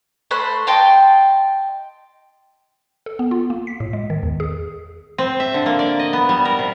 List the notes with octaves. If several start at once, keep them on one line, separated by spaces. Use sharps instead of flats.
A3 C5 B5 F#6
D#5 G5 A5 C6
A4
B3
F4
A#3
B6
A2
G#3
D#3
E2
G#4
C4
E5
D3
A#3
D5
D#5
B3
G3
A#4
C3